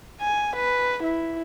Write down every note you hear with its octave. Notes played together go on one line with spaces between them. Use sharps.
G#5
B4
E4